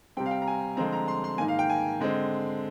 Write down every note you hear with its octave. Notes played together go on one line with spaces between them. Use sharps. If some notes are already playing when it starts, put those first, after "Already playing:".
C3 G3 C4 G5
F5
G5
A#5
G#5
D3 F3 G#3 C4 A#5
A#5
C6
C6
G#2 D#3 A#3 G#5
F5
G5
G#5
D3 G#3 C4